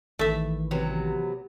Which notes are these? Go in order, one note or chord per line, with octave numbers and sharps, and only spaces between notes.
A1 D#3 E3 A3 E5
C3 F#3 B3